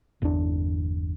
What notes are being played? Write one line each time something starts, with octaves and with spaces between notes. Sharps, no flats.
G1 E2 B2 D4